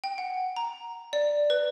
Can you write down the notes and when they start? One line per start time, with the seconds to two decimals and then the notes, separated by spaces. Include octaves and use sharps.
0.04 G5
0.18 F#5
0.56 A#5
1.13 D5
1.50 B4